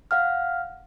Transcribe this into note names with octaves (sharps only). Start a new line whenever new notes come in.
F5 F#5 F6